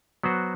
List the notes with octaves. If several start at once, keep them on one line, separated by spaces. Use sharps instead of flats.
F#3 B3 F#4 C5